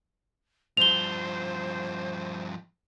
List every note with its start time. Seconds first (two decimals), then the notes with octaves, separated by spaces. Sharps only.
0.77 G2 F3 C5 F7 G7